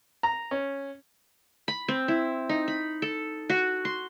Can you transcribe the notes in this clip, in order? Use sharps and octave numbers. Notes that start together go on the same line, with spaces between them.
A#5
C#4
B5
C4
E4
D#4
B5
A4
F#4
C6